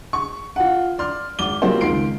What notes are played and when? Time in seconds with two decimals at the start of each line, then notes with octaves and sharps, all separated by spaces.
0.13 C#6
0.56 F4 F#5
0.98 D5 C6 F6
1.39 G#1 D6 G7
1.62 F#3 G3 A#3 C4 F4 C5
1.81 C#2 D#3 C6 C7 D7